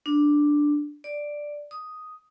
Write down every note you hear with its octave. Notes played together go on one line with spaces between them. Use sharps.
D4
D5
D#6